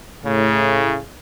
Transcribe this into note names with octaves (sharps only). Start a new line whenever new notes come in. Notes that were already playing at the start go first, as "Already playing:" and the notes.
A2 C#3